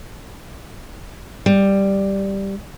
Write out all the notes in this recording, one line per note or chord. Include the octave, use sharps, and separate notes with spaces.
G3